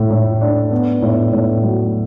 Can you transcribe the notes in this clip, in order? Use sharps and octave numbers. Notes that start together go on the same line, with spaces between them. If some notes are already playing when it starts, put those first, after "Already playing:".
Already playing: A2 A3
A2
D4
B3
A2
A2
F#3